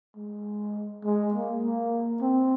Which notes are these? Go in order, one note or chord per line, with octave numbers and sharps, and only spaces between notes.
G#3
G#3
A#3
A#3
C4